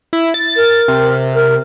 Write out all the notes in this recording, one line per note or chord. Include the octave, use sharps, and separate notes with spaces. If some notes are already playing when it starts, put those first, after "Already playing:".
E4
A6
A#4
C3
A#4